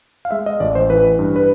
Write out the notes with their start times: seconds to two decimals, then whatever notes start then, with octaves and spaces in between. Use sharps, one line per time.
0.25 F5
0.31 G#3 E5
0.46 D#5
0.60 A1 D5
0.75 C5
0.90 E3 B4
1.19 G2
1.36 B4